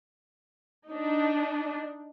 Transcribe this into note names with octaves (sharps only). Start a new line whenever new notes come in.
D4 D#4